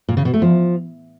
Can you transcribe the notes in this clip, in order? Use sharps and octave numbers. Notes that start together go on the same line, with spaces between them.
A#2
C#3
B2
A3
F3